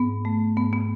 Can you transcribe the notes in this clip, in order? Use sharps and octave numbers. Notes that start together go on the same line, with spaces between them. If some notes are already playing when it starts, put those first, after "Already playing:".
Already playing: G#2 B3
A3
G#2 B3
B3